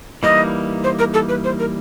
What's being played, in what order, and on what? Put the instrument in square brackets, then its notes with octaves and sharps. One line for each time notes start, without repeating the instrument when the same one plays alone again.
[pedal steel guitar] E3 G3 A#3 D#4 [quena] D#5
[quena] C5
A#4
A4
B4
C5
A#4